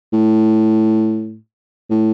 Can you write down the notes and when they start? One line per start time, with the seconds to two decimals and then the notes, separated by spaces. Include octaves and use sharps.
0.13 A2
1.90 A2